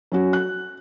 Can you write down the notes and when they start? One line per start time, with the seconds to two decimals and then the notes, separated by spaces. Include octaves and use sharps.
0.12 F#3 C#4 F#4
0.33 F#6